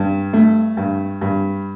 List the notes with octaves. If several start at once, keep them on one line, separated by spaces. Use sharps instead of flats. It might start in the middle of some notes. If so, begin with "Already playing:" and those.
Already playing: G2
A3
G2
G2